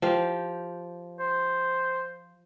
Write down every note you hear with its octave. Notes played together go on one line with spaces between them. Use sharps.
F3 G4 F5
C5